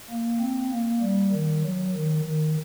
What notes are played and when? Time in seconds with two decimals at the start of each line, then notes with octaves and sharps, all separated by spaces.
0.10 A#3
0.40 C4
0.71 A#3
1.01 G3
1.32 D#3
1.63 F#3
1.94 D#3
2.25 D#3